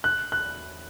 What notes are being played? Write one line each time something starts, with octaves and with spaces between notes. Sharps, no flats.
F#6
F#6